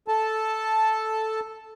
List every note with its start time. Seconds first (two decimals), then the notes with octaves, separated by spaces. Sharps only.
0.08 A4 A5